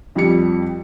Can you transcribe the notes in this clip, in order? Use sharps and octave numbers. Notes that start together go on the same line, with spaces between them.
F2 G3 G4 C#7